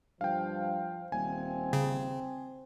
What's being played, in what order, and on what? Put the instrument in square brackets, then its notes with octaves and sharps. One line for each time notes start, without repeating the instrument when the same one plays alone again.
[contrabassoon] G2 [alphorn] F3 [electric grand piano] F5 G5
[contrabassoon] D#1 [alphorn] C4 [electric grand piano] G#5
[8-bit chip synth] C#3